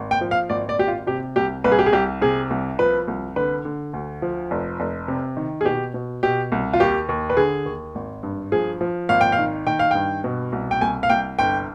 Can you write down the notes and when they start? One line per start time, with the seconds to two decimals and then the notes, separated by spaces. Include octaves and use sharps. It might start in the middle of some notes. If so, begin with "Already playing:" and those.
Already playing: G#1
0.11 G5
0.21 F3
0.31 F5
0.50 G#1 D5
0.69 D5
0.79 G#1 G4
0.88 F4
1.07 C3 G4
1.36 C2 G4
1.64 C2 B4
1.72 G#4
1.79 G4
1.86 G#4
1.92 C2 G4
2.22 C3 G#4
2.50 C2
2.79 F3 B4
3.08 C2
3.36 D3 B4
3.65 D3
3.93 D2
4.22 F3
4.51 F1
4.80 F1
5.08 C3
5.37 D#3
5.61 G#4
5.65 B2 G4
5.94 B2
6.23 B2 G4
6.52 C2
6.73 F4
6.80 D#2 G4
7.09 D#2
7.30 B4
7.37 D3 G#4
7.66 D#2
7.95 G#1
8.23 G2
8.52 F3 G#4
8.81 F3
9.09 G#1 F5
9.21 G5
9.32 F5
9.38 D#3
9.66 D#3 G5
9.79 F5
9.91 G2 G5
10.24 B2
10.52 C2
10.71 G5
10.81 C2 G#5
11.03 F5
11.10 C2 G5
11.39 G1 G5